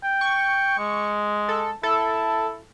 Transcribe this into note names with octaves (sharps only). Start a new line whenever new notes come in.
G5
C#6
G#3
A4
E4 A4